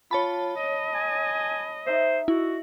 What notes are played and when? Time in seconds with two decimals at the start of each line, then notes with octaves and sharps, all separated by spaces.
0.11 F4 C#5 A5 B5
0.58 D#5
0.94 G#5
1.86 D#4 C5 E5
2.28 E4 F#4